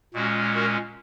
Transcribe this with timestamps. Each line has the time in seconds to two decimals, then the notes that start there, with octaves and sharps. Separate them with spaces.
0.14 A#2 G#3 C#4 F#4
0.54 F#4 A#4